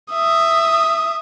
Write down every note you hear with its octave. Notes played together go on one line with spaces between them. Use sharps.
E5 D#6